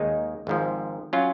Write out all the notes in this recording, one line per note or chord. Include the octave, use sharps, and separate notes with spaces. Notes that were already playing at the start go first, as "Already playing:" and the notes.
Already playing: D#2 D#3 G#3 D#4
G#1 G#2 F3
F#3 C#4 F4